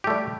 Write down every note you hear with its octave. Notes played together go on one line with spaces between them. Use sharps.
G3 A3 G4